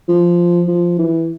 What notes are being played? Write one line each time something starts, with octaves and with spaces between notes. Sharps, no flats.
F3
F3
E3